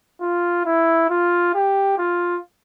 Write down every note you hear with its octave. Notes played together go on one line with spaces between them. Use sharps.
F4
E4
F4
G4
F4